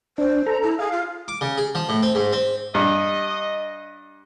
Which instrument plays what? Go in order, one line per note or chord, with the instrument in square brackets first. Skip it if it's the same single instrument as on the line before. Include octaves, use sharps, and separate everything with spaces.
[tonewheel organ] D4 [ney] C5
[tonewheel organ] A4 A#5
[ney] E4
[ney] G#4 [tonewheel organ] F5
[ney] F4
[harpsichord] D6
C#3
G#4
F3
A2
C4
G#2
C4
[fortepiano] G2 [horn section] D#5